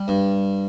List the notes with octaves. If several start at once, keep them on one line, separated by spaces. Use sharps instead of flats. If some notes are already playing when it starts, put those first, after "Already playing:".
Already playing: G3
G2